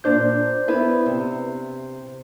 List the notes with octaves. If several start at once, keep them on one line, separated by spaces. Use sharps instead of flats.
A#2 D4 C5 G6
B3 E4 B4
C3